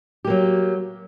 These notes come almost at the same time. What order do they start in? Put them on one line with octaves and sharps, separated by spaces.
G4 A#3 F#3